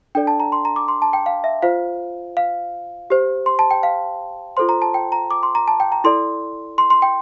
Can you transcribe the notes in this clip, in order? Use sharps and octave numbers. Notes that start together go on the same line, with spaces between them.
D4 A4 D5 G5
A5
A#5
C6
A#5
D6
C6
A5
G5
F5
E5
F4 C5 F5
F5
G4 C5
C6
A5
G5
F5
F4 A4 C5 C6
A#5
A5
G5
A#5
D6
C6
A#5
A5
G5
A#5
E4 A4 D5 C6
C6
C6
G5